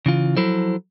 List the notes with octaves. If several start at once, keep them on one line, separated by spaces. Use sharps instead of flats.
C#3 E3 F4
F3 F#3 E4 A4 C5